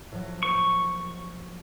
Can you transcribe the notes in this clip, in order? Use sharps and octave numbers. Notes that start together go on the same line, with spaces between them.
A2 F3 F#3
A#3 C5 C#6